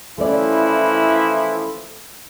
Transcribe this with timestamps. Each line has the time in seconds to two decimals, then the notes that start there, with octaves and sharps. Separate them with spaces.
0.18 E3 F3 A3 C#4 E4 D5